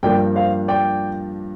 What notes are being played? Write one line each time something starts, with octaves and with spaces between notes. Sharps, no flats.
G2 F3 A#3 D4 D5 G5
C5 F5
D5 G5